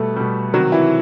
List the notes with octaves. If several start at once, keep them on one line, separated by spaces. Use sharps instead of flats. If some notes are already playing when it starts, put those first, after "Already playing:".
Already playing: B2 G3 A3 A4
B2 G3
C3 D#3 F#3 F#4
E3 E4